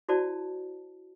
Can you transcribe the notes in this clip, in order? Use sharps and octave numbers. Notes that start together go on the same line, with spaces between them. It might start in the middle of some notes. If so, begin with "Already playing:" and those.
E4 F#4 C5 D5 A5